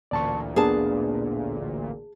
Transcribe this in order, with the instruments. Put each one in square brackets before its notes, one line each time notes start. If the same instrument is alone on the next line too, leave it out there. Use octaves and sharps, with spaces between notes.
[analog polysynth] A1 D2 A#2 [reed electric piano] D5 A5 C#6
[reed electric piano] A#3 B3 D4 [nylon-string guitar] G#4 A5